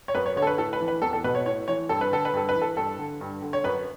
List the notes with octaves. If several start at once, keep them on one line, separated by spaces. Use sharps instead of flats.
C#5
F#2 B4
C#5
D3 C#5
A4
B4
A2 A4
B4
E3
B4
E2 A4
A4
B2 B4
C#5
A2 C#5
E3 C#5
G2 A4
B4
D3 A4
B4
G2 A4
B4
E3
A4
G2 A4
D3
G2
D3
C#5
F#2 B4